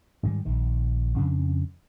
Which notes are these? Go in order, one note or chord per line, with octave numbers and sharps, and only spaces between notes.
G#2 D#3 G3
A#1 D#3
F2 C#3 D4